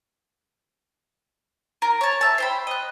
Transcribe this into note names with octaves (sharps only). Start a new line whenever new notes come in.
A#4
C#5 A5
E5 A5
C5 G5 B5
D#5 F#6